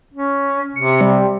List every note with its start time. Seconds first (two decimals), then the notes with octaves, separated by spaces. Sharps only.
0.14 C#4
0.76 C3 C#7
1.01 G3